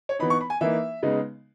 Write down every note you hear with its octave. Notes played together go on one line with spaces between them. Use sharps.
C#5
E3 B3 D#4 B5
C#6
B5
G#5
E3 A#3 D#4 E5
C#3 G#3 B3 D#4